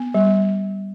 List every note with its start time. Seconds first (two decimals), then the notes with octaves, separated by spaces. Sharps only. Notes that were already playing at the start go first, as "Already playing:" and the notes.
Already playing: B3
0.14 G3